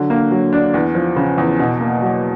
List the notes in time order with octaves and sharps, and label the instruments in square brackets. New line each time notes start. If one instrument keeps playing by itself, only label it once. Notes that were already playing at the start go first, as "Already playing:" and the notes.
Already playing: [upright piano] D3 F#3
A#3
F#3
D4
E2
F3
C#3
E2
B2
A#3
F#3